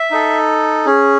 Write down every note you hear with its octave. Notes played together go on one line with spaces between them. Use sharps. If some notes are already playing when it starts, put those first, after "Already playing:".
Already playing: E5
D#4 A4
C#4 G#4